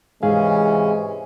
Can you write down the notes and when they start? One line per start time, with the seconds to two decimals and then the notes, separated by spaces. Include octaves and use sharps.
0.23 G#2 C3 E3 G#3 C#4 G#4 F5